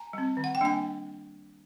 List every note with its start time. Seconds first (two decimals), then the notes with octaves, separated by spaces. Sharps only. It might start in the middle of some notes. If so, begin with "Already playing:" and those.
Already playing: G#5 A#5
0.13 G3 C4
0.37 D#3
0.44 F#5
0.55 G5
0.61 G3 A#3 D4 G#5